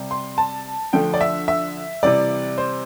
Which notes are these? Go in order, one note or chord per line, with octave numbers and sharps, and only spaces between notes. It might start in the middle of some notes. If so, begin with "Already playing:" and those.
Already playing: C3 G3
C6
A5
D3 F3 A3 G5
D5
E5
E5
C3 E3 G3 D5
C5